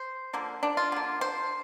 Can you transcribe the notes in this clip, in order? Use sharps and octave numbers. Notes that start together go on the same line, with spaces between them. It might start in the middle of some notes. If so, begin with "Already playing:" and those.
Already playing: C5
D3 F3 A#3
D4
F4
D3 A#3
C5